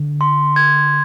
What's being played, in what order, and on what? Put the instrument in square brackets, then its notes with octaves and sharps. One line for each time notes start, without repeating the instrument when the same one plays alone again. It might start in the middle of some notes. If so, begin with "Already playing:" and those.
Already playing: [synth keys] D3
[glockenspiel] C6
G#6